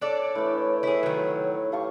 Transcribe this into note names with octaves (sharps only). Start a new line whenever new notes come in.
D4 A4 C#5 D5
A2 E3
E4 G#4
D#3 F#3
G4 F5 A5 C#6